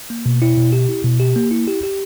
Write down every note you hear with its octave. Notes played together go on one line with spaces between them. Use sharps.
A#3
B2
E4
B2
G4
E4
B2
G4
A#3
E4
G4
G4